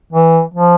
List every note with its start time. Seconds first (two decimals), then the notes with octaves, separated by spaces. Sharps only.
0.13 E3
0.54 F3